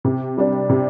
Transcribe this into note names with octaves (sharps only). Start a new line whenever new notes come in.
C3
G3 D4
C3